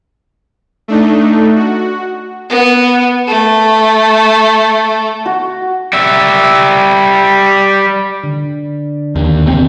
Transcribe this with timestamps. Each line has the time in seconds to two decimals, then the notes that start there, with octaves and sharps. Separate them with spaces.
0.88 A3 D4 D#4
1.56 F#4
2.50 B3
3.27 A3
5.26 F#4
5.93 G3 E5
8.24 D3
9.16 D#2 D3
9.46 G#1 C3 C4